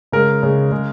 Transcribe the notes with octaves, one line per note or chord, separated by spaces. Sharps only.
C#3 G#3 A#4
C#3 G#3
C#3 G#3